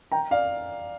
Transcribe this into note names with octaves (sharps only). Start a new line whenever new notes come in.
G5 A#5
D5 F5